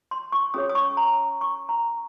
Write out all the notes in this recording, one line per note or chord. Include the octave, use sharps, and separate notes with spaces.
C6
C#6
C#4 G#4 C#5 D#6
D#6
C#6
A#5
C#6
A#5